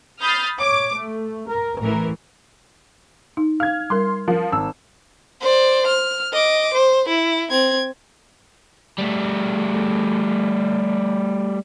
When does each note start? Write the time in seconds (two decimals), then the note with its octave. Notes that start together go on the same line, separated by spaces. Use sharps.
0.21 B5 D#6 F6 G6 A6 C7
0.58 C#5 D6
0.92 A3
1.47 A#4
1.79 A1 A2 E3 A#4
3.37 D#4
3.60 F5 F6 G#6
3.90 G3 A#4 C6
4.28 F3 A#4
4.52 G#1 A5 E6
5.41 C5 D5
5.87 F6
6.32 D#5 D6
6.74 C5
7.09 E4
7.50 C4 G#6
8.99 G3 A3